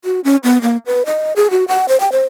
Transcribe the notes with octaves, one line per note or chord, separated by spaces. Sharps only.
F#4
C#4
B3
A#3
B4
D#5
G#4
F#4
F#5
C5
G5
C5